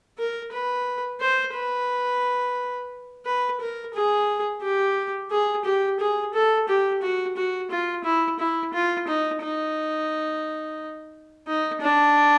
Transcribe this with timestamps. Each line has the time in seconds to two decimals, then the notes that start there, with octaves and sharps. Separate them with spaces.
0.18 A#4
0.52 B4
1.20 C5
1.54 B4
3.25 B4
3.60 A#4
3.94 G#4
4.62 G4
5.31 G#4
5.65 G4
6.00 G#4
6.33 A4
6.68 G4
7.02 F#4
7.36 F#4
7.70 F4
8.04 E4
8.39 E4
8.73 F4
9.07 D#4
9.42 D#4
11.47 D#4
11.82 D4